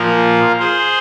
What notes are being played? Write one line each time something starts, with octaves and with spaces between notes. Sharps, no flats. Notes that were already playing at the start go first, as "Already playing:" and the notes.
Already playing: A#2 F3 F4 A#4
G#4 C5